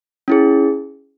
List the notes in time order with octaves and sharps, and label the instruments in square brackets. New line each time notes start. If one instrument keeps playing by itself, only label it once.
[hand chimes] C#4 E4 G#4